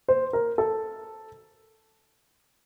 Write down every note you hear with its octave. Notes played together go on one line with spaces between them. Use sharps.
C5
A#4
A4